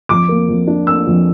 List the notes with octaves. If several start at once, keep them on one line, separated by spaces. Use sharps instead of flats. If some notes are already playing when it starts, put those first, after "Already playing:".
F2 D6
A#3
F2
D4
A#3 E6
F2